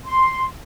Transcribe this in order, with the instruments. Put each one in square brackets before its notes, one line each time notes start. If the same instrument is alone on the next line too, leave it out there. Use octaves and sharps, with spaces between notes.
[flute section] C6